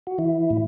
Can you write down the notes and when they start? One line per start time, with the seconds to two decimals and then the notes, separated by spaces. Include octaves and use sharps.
0.07 F#4
0.18 E3 E4
0.50 A2